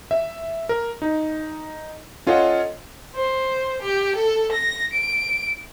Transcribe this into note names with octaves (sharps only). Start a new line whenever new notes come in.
E5
A#4
D#4
C#4 F4 A4 C#5 D#5 F#5
C5
G4
A4
A#6
D7